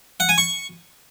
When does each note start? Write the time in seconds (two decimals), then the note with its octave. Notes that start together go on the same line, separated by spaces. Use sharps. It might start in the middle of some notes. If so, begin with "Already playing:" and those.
0.20 F#5
0.29 G#5
0.38 C#6